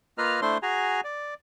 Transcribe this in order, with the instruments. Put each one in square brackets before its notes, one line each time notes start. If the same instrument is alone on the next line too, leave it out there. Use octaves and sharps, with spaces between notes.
[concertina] A#3 F4 B4 D#5 A#5 F6
A3 D4 E4 C5 C6
F#4 G#4 G#5 A#5
D5